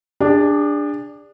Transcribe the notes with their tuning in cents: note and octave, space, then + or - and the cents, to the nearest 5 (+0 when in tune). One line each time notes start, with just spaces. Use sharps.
D4 +0 G#4 -40